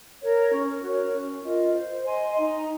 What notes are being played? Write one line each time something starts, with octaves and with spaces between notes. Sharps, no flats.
A#4 C#5
C#4
F#4 A#4 C#5
C#4
F4 A#4 D#5
C5
D#5 G#5 C6
D#4